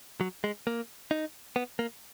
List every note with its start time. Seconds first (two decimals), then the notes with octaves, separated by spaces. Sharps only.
0.21 F#3
0.44 G#3
0.67 A#3
1.11 D#4
1.56 B3
1.79 A#3